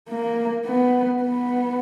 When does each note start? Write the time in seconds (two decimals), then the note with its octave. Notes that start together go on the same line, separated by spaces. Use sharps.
0.09 A#3
0.66 B3
1.23 B3